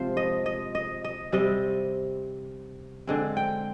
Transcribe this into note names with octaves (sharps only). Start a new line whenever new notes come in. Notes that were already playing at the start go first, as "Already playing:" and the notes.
Already playing: C3 F3 G#3 C4 F4 C5
D#5
D#5
D#5
D#5
C3 G3 C4 D#5
D3 G#3 C4
G5